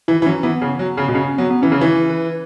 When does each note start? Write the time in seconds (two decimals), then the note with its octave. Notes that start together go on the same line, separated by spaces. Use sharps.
0.08 E3 E4
0.22 E3
0.26 F#3 C#4
0.43 E3 B3
0.61 C#3
0.79 F#3
0.97 C#3
1.08 B2
1.14 C#3 C#4
1.38 F#3 B3
1.51 B3
1.62 E3 C#4
1.71 C#3
1.81 E3 E4
2.10 B4